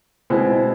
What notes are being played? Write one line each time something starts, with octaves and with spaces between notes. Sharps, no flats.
B2 G#3 C4 E4